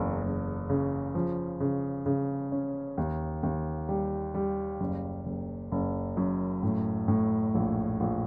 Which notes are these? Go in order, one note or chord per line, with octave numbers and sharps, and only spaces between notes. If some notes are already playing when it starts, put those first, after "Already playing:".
Already playing: F#1 E2
F#1
C#3
F3
C#3
C#3
C#4
D#2
D#2
G3
G3
F#1
F#1
F#1
F#2
A2
A2
A#1
A#1